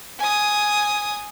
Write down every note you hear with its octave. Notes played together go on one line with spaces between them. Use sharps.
G#5 D#6